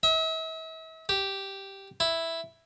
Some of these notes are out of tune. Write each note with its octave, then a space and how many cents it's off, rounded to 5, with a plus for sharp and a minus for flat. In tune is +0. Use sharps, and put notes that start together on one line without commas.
E5 -40
G4 -5
E4 +0